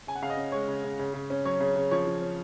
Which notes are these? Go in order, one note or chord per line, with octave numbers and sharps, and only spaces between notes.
C#3 G#5
F#5
C#3 F5
D#5
C#4
G#3 C#5
C#3
C#3
C#3
C#3
C#4
F#3 C#5
C#3
C#3
F3 C#5
F3
C#4